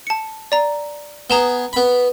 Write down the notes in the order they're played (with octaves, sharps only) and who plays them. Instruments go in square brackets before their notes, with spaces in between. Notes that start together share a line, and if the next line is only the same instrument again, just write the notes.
[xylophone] A5 C#7
D5 A#5
[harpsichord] B3 G#4 [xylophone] A#5 E7 G7
[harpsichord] B3 B5